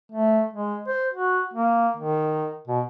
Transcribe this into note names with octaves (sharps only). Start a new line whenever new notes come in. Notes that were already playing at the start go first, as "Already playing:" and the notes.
A3
G#3
C5
F#4
A#3
D#3
B2